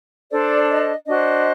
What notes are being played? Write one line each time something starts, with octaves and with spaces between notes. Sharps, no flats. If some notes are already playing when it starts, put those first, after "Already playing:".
D4 A4 C5 D5
D#5
D4 F#4 C5 D#5